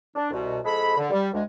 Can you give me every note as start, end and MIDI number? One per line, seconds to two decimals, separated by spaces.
0.15 0.28 62
0.31 0.59 36
0.31 0.59 47
0.64 0.94 41
0.64 0.94 56
0.64 0.94 69
0.64 0.94 83
0.97 1.08 50
1.10 1.28 55
1.33 1.41 38
1.33 1.41 56